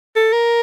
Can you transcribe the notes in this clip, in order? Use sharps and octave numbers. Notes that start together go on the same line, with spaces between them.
A4
A#4